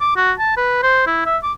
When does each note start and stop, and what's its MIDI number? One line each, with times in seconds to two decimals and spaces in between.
0.01 0.14 86
0.16 0.32 66
0.39 0.54 81
0.57 0.82 71
0.83 1.04 72
1.07 1.24 64
1.26 1.37 76
1.43 1.52 86